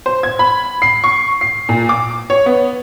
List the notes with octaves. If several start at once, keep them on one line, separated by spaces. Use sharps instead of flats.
C5
G#6
B5
C7
C#6
C7
A#2
D6
C#5
B3